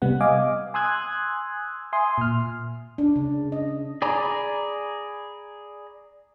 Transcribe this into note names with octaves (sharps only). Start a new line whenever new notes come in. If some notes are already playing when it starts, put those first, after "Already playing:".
C3 G3 B3 F#5
D#5 F5 G#5 D6
G#5 C6 D#6 E6 F#6 G#6
E5 G#5 C6 D#6
A#2 F6
D4
C#3
D#5
G#4 D5 G#5 A#5 B5